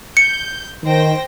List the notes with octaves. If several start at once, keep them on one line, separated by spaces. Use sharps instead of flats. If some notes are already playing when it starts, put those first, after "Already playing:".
G6 C#7
D#3 C5 G5 A#6